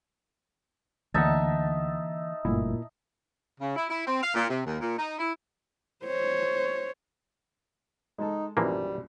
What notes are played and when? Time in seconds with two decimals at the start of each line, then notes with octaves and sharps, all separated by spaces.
1.14 D2 D3 E3 A#3 D#4 E5 F#5 A5
2.45 F#1 G2 A#2 A3 E4
3.59 C#3
3.76 E4
3.89 E4
4.06 C4
4.22 F5
4.34 A#2
4.48 C3
4.65 D#2
4.80 A#2
4.97 D#4
5.19 E4
6.04 C5 C#5
8.19 G#3 D#4 A4
8.57 A#1 F#2 B2 E3 F3 G3 A#3